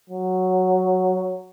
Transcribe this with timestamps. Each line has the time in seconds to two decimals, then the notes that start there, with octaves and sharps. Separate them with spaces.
0.09 F#3